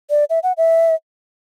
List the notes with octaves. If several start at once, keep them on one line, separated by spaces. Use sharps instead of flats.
D5
E5
F#5
E5